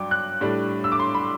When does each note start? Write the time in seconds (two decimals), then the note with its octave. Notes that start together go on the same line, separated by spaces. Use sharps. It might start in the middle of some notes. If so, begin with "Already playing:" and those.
Already playing: G2 F#3 D5 G5 D6
0.11 F#6
0.41 A2 G3 D4
0.84 E6
0.92 D6
0.99 C6
1.14 B5